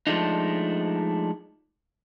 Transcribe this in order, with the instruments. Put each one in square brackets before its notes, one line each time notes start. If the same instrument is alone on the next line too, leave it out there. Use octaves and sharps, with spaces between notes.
[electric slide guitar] F3 G#3 A3 D4 D#4